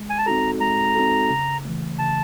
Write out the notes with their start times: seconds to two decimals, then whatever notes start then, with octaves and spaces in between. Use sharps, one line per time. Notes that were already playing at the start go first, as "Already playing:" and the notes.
Already playing: G#3
0.10 G#5
0.18 A5
0.26 C4 D#4 F#4 A4 A#5
0.60 G#3 A#5
0.95 C4 D#4 F#4 A4
1.30 C#3
1.65 E3 A3
1.99 C#3 A5